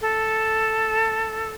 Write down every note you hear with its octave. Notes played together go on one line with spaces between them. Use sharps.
A4